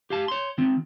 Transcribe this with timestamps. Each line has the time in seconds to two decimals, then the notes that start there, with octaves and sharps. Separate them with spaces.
0.10 G4 F5 A5
0.28 C#5 C6
0.58 D#3 C4